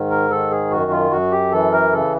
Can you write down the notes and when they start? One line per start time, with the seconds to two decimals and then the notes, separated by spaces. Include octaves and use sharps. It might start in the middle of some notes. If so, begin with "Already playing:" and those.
Already playing: G#2 D#3
0.10 A#4
0.31 D#3 A4
0.51 G#4
0.71 F#2 F#4
0.91 F4
1.11 F#2 F#4
1.32 G4
1.52 E3 A4
1.73 A#4
1.92 C#3 A4